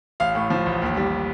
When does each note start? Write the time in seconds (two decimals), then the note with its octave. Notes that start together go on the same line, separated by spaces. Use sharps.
0.20 A1 F5
0.35 A2
0.50 F3
0.66 A1
0.82 D#2
0.97 G3